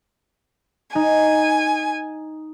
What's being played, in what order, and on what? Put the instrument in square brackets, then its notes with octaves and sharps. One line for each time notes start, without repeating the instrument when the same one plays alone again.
[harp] D#4 [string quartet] G#5